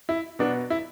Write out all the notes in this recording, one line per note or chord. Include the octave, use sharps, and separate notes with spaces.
E4
B2 F#3 B3 D4
E4